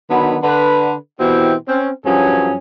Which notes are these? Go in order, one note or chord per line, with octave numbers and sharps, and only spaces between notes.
D3 D#3 F#3 B3 B5
D3 B4
B2 E3 C4 E4 G4
C4 C#4
G2 F3 F#3 C#4 G#4 G#5